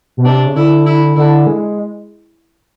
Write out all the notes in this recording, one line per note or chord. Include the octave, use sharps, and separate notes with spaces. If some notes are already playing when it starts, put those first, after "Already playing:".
B2
C3 D4
C#3
D3 E4
E4
D3 E4
G#3